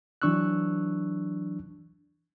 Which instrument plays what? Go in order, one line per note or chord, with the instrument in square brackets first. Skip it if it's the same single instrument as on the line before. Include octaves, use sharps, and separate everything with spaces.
[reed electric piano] E3 F#3 D4 C#6 E6 F#6